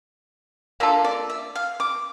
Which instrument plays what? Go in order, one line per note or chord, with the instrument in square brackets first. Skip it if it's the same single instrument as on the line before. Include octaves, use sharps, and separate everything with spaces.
[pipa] A#3 D4 F4 A4 [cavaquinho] E5
[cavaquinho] D5
E5
F5
D6